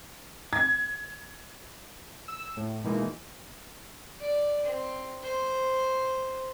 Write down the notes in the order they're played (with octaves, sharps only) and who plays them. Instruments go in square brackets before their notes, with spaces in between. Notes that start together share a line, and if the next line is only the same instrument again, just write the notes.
[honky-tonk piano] G#6
[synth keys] E6
A2
B2 E3 G#3 A#3 D#4
[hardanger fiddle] D5
C4
C5